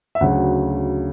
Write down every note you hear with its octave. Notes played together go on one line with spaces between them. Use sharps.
E5
D2 C#3 F#3 F#5